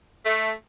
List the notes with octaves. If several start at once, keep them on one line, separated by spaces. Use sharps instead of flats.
A3